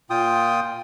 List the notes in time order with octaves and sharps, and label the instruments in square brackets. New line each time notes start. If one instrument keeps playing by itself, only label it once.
[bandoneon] A#2 F4 G5 D#6